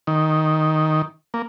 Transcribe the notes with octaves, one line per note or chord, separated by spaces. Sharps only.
D#3
A#3